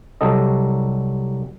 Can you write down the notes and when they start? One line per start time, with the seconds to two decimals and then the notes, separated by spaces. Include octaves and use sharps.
0.21 C2 F#3 G3 A4 D#5